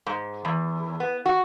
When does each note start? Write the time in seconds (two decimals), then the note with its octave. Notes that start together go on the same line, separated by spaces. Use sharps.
0.07 G#2
0.45 E2
1.00 B3
1.26 F#4